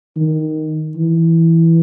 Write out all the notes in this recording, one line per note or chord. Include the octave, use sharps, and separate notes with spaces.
D#3
E3